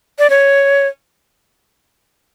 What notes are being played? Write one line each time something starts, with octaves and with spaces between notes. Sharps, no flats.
D5
C#5